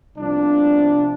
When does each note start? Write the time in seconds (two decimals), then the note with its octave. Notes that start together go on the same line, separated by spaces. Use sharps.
0.18 C2 C3 F3 B3 D4